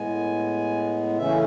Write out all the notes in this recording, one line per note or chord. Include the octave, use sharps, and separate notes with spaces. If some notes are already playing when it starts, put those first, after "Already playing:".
Already playing: A2 G#3 B3 G#5
C#3 E3 A3 C#4 E5